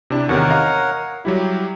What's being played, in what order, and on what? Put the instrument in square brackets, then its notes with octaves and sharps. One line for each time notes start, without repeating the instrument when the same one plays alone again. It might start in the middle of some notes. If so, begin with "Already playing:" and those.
[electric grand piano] C3 D4 E4
[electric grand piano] E2 C3 D#3 [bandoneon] A#4 C#5 F#5
[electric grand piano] D#5 F5 A#5
[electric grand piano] F#3 G3 E4 [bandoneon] G4